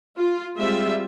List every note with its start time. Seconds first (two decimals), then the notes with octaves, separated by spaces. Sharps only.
0.19 F4
0.58 G3 G#3 C4 F4 E5